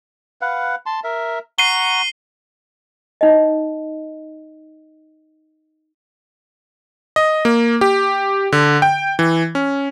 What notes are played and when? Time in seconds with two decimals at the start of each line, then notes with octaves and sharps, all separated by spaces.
0.41 B4 F5 F#5
0.86 A5 C6
1.04 A#4 E5
1.58 F#5 A#5 C#6 C7 D#7 G7
3.21 D#4 D#5
7.16 D#5
7.45 A#3
7.81 G4
8.52 D3
8.82 G5
9.19 E3
9.55 C#4